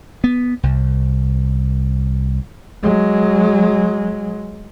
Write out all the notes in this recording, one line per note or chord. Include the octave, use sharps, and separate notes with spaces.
B3
C2
F#3 G#3